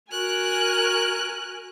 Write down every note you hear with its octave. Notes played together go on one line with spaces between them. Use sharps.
F#4 A#4 G#5 F#6